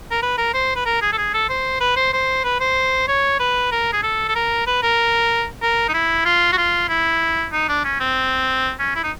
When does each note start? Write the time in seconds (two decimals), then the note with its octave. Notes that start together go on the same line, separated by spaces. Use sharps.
0.11 A#4
0.23 B4
0.38 A#4
0.54 C5
0.76 B4
0.86 A#4
1.02 G#4
1.13 A4
1.18 G#4
1.34 A4
1.49 C5
1.81 B4
1.97 C5
2.13 C5
2.44 B4
2.60 C5
3.08 C#5
3.39 B4
3.72 A#4
3.93 G#4
4.03 A4
4.28 A4
4.35 A#4
4.67 B4
4.83 A#4
5.62 A#4
5.89 D#4
5.94 E4
6.25 F4
6.53 F#4
6.58 F4
6.89 E4
7.52 D#4
7.69 D4
7.84 C#4
8.00 C4
8.79 C#4
8.95 E4
9.04 D#4